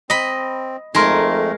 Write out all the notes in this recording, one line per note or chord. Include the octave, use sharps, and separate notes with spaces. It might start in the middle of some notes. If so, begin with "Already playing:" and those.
C4 D#5 B5
F2 G#3 A3 D#4 A#4 C6